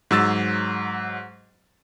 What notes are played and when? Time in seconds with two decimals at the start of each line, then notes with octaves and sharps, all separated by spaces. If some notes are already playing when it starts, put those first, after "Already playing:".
0.11 G#2 F#3 E6 A6